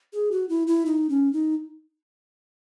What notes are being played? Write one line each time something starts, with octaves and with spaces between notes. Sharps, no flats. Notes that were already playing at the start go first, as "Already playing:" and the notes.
G#4
F#4
E4
E4
D#4
C#4
D#4